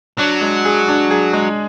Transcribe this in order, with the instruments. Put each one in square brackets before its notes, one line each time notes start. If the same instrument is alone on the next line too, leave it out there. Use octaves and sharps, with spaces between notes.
[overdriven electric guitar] F#3 [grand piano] D4
[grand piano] G#3
G#4
D4
G#4
G#3